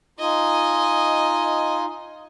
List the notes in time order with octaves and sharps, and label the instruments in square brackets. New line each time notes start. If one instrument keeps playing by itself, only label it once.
[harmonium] D#4 F4 [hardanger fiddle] D#5 G#5